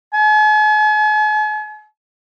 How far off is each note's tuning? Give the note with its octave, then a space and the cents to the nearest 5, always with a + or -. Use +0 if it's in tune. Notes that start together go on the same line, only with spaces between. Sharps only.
G#5 +45